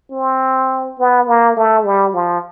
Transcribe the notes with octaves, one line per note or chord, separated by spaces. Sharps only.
C4
B3
A#3
A3
G3
F3